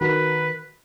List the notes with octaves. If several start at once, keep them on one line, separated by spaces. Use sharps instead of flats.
D#3 F#4 A#4 B4